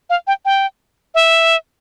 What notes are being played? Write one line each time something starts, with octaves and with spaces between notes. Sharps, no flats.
F5
G5
G5
E5